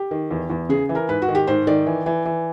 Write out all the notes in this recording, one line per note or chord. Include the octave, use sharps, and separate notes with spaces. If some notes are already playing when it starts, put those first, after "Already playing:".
Already playing: G4
D#3
E2
E2
C#3 G#4
E3
A#4
G#2 B4
F#4
D#3
G4
G#2 C5
D#3 D5
E3
E3
E3